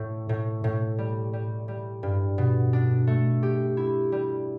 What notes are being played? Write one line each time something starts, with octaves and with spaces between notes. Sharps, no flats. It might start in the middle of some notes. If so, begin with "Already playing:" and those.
Already playing: A2
A2
A2
G3
G3
G3
G2
B2
D4
A3
G4
E4
G3